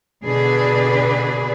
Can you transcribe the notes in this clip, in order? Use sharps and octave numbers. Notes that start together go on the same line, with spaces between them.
B2 D3 D4 G#4 B4